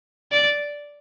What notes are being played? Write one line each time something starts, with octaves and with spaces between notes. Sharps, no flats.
D5